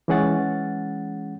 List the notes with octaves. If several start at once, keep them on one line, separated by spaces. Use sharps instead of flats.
E3 G#3 C#4 G#4 F#5 A6